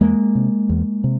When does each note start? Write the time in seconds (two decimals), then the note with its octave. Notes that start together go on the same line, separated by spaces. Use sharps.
0.01 E2 G#3 A#3
0.35 C3
0.69 E2
1.04 C3